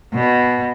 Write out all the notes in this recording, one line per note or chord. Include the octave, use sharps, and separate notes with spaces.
B2